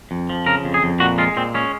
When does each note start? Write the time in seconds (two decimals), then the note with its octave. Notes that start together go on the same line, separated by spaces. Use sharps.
0.11 F2
0.30 F3
0.46 C#3 A#4
0.65 F2
0.74 G#4
0.83 F2
1.00 A#2 F#4
1.18 G#3 F4
1.37 A#2 C4
1.54 G#3 C#4